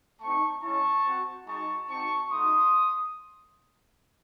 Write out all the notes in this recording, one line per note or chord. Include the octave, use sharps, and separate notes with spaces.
A3 C4 D#4 A5 C#6
G#3 C#4 E4 A5 C#6
C4 F#4
G#3 D#4 F#4 A5 C#6
C4 D#4 F#4 A5 C#6
A3 D#4 F#4 C6 D#6